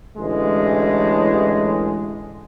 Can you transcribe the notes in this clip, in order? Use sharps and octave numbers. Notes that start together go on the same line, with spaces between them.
A1 D3 G#3